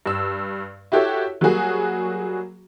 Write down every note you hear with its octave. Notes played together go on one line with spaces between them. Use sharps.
G2 E6
E4 F#4 G4 A4 C#5
F#3 G3 A#3 F#4 G#4